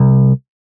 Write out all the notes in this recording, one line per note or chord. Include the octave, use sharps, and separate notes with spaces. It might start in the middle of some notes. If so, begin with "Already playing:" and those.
Already playing: C2